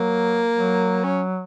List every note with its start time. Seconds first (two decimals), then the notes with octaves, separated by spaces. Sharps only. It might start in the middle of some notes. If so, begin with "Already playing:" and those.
Already playing: F#3 A#3
0.52 F#3
1.04 C#4